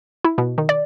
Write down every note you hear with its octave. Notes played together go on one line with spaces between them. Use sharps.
E4
B2
D#3
D5